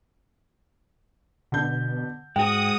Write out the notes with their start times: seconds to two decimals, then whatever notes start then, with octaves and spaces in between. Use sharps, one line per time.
1.52 B2 D3 G6
2.36 G#2 G#3 F#4 G5 D#6